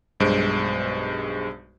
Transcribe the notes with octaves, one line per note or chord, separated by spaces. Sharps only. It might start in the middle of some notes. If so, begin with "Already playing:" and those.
B1 G2 G#3 C5 D7